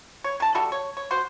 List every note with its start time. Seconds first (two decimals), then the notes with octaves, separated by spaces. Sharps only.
0.24 C#5
0.40 D#3 A5
0.55 G3 F#4 A4 E5
0.72 C#5
0.97 C#5
1.11 F#4 C5